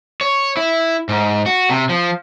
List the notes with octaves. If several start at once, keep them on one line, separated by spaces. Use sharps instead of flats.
C#5
E4
G#2
F#4
C3
F3